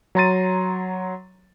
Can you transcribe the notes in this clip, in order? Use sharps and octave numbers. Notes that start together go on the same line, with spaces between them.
F#3 C#5 A#5 C6 A6 D#7